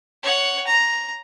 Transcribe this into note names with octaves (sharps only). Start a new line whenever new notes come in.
C#5 F#5
A#5